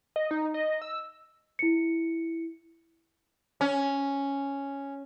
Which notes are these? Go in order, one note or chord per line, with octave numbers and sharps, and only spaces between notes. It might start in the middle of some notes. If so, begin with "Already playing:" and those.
D#5
D#4
D#5
E6
E4 C#7
C#4